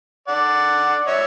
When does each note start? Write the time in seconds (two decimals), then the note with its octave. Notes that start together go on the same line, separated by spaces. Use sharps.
0.28 D5 F#5
1.07 C#5 E5